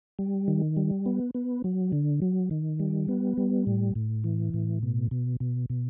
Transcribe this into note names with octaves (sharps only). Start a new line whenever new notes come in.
G3
D#3
G3
B3
B3
F#3
D3
F#3
D#3
G3
B3
G3
A2
A2
E3
A2
B2
B2
B2
B2